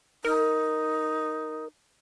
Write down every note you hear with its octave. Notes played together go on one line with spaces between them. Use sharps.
D#4 A#4